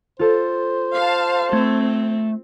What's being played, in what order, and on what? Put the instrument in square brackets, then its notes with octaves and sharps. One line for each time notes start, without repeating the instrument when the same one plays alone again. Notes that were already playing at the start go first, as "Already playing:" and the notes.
[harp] F4 A4 [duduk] C5
[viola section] F5 A5
[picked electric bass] A3 [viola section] C4 [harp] G#6